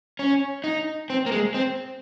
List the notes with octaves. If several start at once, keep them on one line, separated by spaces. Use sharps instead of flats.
C#4
D#4
C4
A#3
G#3
C4